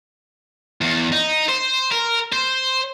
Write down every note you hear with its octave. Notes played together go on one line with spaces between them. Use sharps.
E2
D#4
C5
A#4
C5